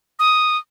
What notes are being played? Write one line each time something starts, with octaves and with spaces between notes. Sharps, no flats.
D#6